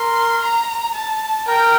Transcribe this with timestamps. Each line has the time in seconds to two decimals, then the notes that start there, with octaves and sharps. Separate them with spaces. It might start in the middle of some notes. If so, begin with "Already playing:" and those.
Already playing: A#4 C6
0.42 A#5
0.95 A5
1.48 A#4 G5